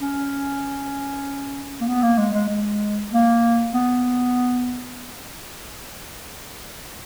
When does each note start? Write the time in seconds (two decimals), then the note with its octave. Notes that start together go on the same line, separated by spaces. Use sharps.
0.01 C#4
1.81 A#3
1.88 B3
2.03 A#3
2.18 G#3
2.33 G#3
2.48 G#3
3.12 A#3
3.74 B3